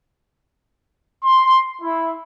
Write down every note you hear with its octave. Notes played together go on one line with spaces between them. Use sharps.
C6
E4